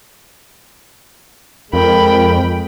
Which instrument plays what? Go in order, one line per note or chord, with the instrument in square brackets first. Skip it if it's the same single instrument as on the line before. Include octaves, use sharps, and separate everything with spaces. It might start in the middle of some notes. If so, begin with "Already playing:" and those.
[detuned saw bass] F2 [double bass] G#3 [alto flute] A#4 [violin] G5 B5